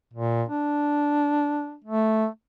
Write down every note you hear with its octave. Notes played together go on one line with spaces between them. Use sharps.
A#2
D4
A3